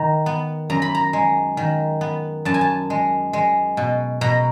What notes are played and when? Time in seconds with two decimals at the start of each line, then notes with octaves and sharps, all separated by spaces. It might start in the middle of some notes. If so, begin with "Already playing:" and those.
Already playing: D#3 A#5
0.26 B3
0.70 F#2 A#5
0.82 B5
0.95 A#5
1.13 G#3
1.57 D#3
2.01 B3
2.45 F#2 A5
2.54 G#5
2.61 A5
2.90 G#3
3.33 G#3
3.77 B2
4.21 B2 A#5